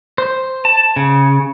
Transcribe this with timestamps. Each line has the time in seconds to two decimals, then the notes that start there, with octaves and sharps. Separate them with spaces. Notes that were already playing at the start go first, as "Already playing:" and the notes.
0.18 C5
0.65 A5
0.96 C#3